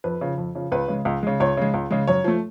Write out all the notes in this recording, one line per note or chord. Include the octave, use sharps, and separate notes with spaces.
F2 B4
C#3 F3
F2
C#3 F3
C#2 B4
C#3 G#3
C#2
C#3 G#3
C#2 C#5
C#3 G#3
C#2
C#3 G#3
F#2 C#5
F3 A3